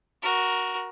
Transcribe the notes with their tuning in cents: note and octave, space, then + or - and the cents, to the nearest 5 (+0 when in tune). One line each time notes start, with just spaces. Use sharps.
F#4 +0 A#4 +15